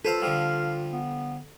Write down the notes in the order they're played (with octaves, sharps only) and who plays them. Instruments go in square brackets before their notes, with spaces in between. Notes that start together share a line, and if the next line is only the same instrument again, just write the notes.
[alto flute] F4 [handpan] A4 [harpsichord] B4 C5 F5
[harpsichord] D3 F3 G3 [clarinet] F5
[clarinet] B3